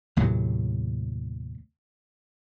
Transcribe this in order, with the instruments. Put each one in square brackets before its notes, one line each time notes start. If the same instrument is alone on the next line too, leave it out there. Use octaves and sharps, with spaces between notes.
[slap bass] D#2 A2 C3 F#3